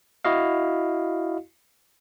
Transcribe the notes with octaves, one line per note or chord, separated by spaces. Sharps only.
E4 F#4 D#5 F5